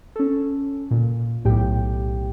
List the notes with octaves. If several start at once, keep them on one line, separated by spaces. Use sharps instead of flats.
C#4 A4
A#2
B1 A2 G4 G5